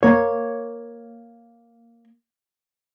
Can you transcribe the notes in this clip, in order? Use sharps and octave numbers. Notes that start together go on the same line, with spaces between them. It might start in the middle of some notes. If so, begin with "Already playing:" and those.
A#3 C#5